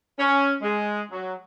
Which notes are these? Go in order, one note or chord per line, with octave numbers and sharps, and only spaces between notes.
C#4
G#3
F#3